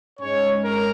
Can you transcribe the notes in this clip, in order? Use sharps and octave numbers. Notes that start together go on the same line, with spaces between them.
G#2 G#3 C#4 C#5
A#4